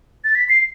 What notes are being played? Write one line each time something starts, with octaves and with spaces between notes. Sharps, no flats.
A6
B6
C7